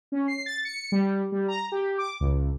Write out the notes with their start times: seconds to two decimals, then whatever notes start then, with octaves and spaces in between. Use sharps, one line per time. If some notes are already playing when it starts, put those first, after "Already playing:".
0.12 C#4
0.28 C7
0.46 A6
0.65 C#7
0.92 G3
1.32 G3
1.48 A#5
1.72 G4
1.98 D6
2.20 C#2